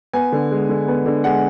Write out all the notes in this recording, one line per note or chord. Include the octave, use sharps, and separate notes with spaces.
B3 G#5
D3
G#3
D3
B3
D3
G#3 F#5